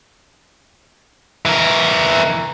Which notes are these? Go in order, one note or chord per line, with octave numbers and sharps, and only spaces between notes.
E3 A#4